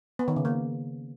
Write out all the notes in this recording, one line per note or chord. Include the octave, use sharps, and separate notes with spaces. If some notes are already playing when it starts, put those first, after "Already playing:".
B3
D#3
C#3
A#3